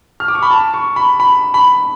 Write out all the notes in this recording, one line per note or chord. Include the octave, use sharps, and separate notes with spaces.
F6
D6
C#6
B5
A5
C#6
B5
B5
B5